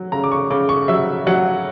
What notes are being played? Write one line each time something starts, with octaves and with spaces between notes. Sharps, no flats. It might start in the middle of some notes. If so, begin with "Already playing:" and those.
Already playing: F#3
C#3 A#5
D6
C#6
C#3 D6
C#6
F#3 E5
F#3 F#5